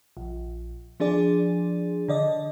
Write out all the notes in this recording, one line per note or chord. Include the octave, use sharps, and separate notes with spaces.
A#1
F3 D4 G#4 D5
D3 D5 D#5